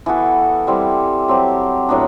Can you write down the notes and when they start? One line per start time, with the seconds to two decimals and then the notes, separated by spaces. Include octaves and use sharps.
0.06 E3 B3 F#4 A4
0.67 G3 C4 E4 G4
1.28 F#3 C4 G4
1.89 A2 F#3 B3 D4